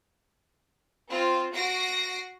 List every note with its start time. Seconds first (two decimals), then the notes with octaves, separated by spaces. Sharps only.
1.09 C4 F4
1.53 F#4 A#6 C7 D7